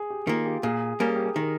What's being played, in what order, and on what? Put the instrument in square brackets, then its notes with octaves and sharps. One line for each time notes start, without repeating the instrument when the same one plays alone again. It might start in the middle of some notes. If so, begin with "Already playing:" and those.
Already playing: [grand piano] G#4
G4
[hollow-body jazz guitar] D#3 A#3 [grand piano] F4
[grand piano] G4
[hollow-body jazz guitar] A#2 [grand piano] G#4
[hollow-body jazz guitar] G3 A#3 C#4 [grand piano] A#4
[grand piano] G#4
G4
G#4
[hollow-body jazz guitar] D#3 [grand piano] A#4